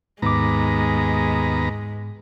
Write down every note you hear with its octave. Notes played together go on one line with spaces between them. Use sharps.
D#2 G#2 G#3 B3 A#5 D6